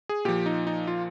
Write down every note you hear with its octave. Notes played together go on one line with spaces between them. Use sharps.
G#4
A#2 F3 G4
D#4
D#4
F4